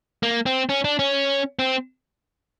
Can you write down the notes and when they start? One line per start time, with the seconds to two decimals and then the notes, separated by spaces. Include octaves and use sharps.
0.23 A#3
0.46 C4
0.69 C#4
0.84 D4
0.99 C#4
1.59 C4